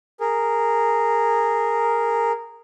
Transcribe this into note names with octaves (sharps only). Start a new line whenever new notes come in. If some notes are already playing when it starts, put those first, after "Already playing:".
G#4 A#4